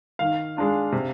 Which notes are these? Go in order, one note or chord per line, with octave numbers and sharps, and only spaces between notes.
D#3 F5
G#3 D4 F4
C3